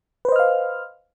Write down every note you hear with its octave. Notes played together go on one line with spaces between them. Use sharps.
B4 C5 D#5 F5 F6